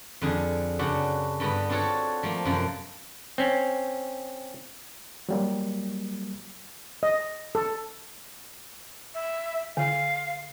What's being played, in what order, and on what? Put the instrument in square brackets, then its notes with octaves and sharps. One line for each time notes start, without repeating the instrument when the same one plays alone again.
[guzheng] F2 D3 G#4
F#2 C#3 D4 F#4 F#5
G2 D3 B3
C4 D4 F4 F#4 A4 C#5
F3 A3 A#3
F#2 C3 F3
[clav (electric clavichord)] C4 C#4
[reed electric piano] F#3 G3 A#3
[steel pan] D#5
A4
[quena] E5
[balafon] D3 [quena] F5